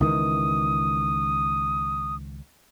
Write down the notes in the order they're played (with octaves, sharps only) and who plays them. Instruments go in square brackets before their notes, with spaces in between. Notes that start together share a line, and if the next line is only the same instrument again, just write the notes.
[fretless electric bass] C#2 D#3 E3 [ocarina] D#6